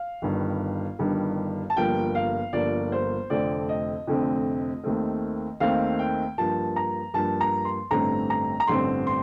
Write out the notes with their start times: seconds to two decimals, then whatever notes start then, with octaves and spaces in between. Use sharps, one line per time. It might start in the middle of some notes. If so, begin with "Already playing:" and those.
Already playing: F5
0.22 G1 G2 D#3 G3
0.99 G1 G2 D#3 G3
1.70 A5
1.76 G1 G2 F3 A#3 G5
2.15 F5
2.53 G1 G2 F3 A#3 D5
2.92 C5
3.30 F1 F2 D3 A3 C4 D5
3.69 D#5
4.07 F1 F2 D3 A3 C4
4.83 D#2 D#3 A3 C4
5.60 D#2 D#3 A3 C4 F5
5.99 G5
6.38 G2 F3 A#3 A5
6.76 A#5
7.14 G2 F3 A#3 A5
7.41 A#5
7.65 C6
7.91 A1 G2 D3 A3 C4 A#5
8.30 A#5
8.60 A#5
8.67 A1 G2 D3 A3 C4 C6
9.07 C6